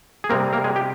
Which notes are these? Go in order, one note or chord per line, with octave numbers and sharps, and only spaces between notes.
G#4
C3 G3 A#3 C4 A#4
A#3 A#4
G#3 G#4
G4